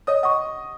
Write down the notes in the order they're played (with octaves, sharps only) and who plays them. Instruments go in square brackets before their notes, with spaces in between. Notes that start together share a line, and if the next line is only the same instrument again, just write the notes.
[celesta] C#5 [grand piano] D#5 D#6
[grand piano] D#5 D#6 [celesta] F#5 C#6